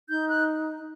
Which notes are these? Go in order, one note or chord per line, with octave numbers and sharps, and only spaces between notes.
D#4 G6
F#6